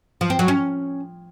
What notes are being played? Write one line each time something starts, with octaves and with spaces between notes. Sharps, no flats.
F3
C4
F#3
C#4